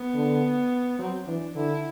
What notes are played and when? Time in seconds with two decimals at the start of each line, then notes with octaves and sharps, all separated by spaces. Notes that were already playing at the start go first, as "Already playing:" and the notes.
Already playing: B3
0.14 D3
0.99 F#3 C4
1.27 E3 D4
1.55 D3 E4